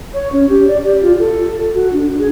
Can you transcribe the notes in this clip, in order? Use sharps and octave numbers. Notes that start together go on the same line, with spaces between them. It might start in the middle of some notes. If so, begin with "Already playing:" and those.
C#5
C#4
G4
D5
G4
F4
A4
F#4
D4
G#4